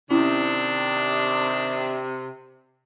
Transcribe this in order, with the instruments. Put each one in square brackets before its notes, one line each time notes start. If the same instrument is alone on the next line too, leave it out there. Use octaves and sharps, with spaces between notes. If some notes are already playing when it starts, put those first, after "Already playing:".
[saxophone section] C3 [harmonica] D#3 D4 [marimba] C#4 E4